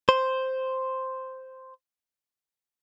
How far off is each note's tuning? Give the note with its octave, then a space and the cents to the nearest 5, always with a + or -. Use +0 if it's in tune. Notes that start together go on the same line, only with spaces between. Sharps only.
C5 +0